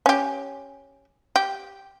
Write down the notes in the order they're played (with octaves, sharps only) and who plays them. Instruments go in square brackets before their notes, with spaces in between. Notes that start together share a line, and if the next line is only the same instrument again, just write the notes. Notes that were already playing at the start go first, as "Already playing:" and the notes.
[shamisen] C#4 G4
G4